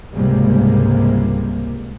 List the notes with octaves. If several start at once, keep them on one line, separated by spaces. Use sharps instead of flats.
C#2 G#2 C3 G3 G#3 A#3